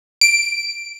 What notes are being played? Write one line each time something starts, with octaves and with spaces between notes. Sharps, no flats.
D7